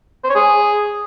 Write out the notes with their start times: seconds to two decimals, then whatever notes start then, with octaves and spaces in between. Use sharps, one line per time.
0.24 C5
0.29 C#5
0.35 G#4